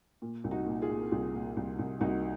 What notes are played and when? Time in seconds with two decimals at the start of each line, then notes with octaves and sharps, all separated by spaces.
0.22 A#2
0.44 C2
0.51 D#4 F#4
0.66 A#2
0.82 F4 G#4
0.90 A#2
1.11 C2 F4 G#4
1.33 A#2
1.57 C2
1.79 C2
2.01 C2 D#4 F#4